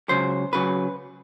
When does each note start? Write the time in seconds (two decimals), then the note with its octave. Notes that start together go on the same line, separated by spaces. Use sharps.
0.09 C#2 C#3 F#3 C5
0.53 C#3 F#3 B4